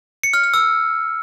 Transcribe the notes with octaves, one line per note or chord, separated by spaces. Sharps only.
C#7
F6
F6
E6